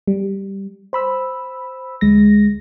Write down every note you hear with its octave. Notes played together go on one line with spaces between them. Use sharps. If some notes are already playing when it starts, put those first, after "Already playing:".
G3
C5 B5 E6
D2 G#3 A#6